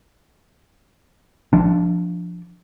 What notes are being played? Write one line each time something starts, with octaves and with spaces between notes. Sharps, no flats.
F3 D4